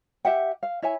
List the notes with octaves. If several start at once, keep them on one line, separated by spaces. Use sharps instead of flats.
G4 E5 F#5 G5
F5
E4 C#5 E5 G#5